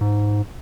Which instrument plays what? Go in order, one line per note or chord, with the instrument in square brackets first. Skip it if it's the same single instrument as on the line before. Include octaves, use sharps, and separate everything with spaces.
[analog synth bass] G#2